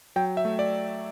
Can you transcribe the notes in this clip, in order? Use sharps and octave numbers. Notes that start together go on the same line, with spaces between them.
F#3 G5
E5
A3
D5